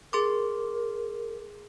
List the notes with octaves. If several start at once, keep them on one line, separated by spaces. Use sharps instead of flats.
G#4 A#4 C6 D6